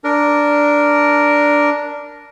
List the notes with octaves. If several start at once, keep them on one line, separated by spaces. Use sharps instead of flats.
D4 A#4